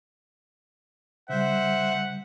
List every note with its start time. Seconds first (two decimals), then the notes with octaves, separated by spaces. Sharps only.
1.30 C#3 G3 C5 E5 F#5